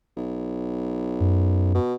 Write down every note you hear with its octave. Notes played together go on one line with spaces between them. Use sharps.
B1
F#2
B2